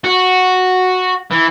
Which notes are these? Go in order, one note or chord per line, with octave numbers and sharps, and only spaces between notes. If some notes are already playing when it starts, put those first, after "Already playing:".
F#4
E3